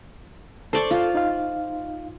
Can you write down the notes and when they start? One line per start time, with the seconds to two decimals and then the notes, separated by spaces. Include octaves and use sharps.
0.73 A4 C5 D5 C#6
0.91 F4
1.15 D#4 F5